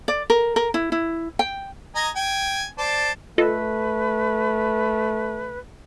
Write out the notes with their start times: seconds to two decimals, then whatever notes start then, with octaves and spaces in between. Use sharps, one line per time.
0.08 D5
0.30 A#4
0.56 A#4
0.74 E4
0.92 E4
1.39 G5
1.95 D#5 G#5 A#5
2.16 G5 G#5
2.78 C5 D5 A5
3.38 A3 F4 A4 B4 D#5